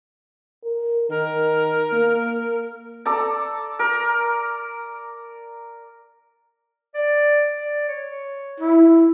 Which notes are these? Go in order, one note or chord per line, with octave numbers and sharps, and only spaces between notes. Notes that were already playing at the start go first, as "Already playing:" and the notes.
A#4
D#3 A#4
A#3
A4 D5 A#5
A#4
D5
D5
C#5
E4